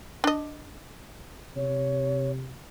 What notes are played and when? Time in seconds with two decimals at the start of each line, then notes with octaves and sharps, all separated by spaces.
0.24 D4 D#5
1.56 C3 C#5